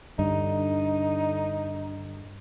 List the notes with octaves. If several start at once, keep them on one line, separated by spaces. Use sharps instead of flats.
G2 D3 D#4